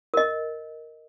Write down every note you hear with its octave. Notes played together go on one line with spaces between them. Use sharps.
A#4 D#5